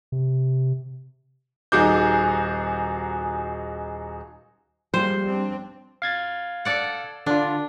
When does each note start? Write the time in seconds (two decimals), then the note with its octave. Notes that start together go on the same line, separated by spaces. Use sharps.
0.12 C3
1.72 D#1 D#4 F#4 G#4 D6 G6
4.94 F3 G3 G#3 A#3 C5
5.26 C4 D4
6.02 F5 G#6 A6
6.65 A4 D5 F#5
7.26 D3 D4 F4